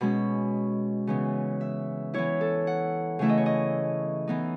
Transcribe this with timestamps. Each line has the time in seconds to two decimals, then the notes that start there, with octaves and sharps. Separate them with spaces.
0.01 B2 G#3 C#4 B5
1.07 C#3 E3 B3
1.61 E5
2.14 E3 B3 E4 C#5
2.41 A4
2.67 F#5
3.19 C#3 E3 A3 E4 E5
3.29 D#5
3.38 C#5
3.46 D#5
4.28 E3 B3 D#4